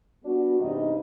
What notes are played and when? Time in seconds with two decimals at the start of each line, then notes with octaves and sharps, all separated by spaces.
0.25 G3 B3 D4 F#4
0.60 E2 G2 C3 G3 D#4